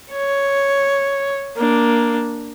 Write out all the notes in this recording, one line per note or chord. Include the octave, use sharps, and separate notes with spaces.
C#5
A#3 D4